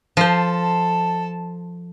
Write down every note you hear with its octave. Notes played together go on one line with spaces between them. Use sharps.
F3 A4 C5 A5